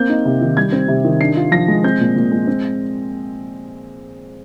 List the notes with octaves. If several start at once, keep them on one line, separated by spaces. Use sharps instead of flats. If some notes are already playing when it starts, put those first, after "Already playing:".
Already playing: A#3 C4 G6
D#4
C3
D#3
G3 G#6
C4
C3
D#3
D4 C7
F4
F3 A#6
G#3
C4 G6
A#2
A#2
G#3
C4